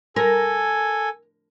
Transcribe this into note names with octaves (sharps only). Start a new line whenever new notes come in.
A4 A#4 G#5